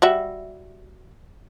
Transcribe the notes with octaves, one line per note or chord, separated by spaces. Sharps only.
G3 F#4 E5